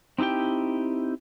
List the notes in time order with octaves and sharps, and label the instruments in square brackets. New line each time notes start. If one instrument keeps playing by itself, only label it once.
[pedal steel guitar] C4 D#4 E4 G4 G5